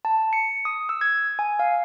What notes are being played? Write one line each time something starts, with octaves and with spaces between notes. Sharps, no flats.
A5
C#7
D#6
E6
G#6
G#5
F5